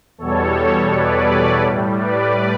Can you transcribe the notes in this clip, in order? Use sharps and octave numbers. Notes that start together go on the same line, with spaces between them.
E2 B2 G3 A4 C#5
B4 D5
A2 G3
B4 D5